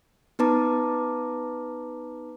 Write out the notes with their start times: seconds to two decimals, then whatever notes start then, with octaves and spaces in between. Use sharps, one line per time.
0.39 B3 D#4 B4 A5 A#5 D6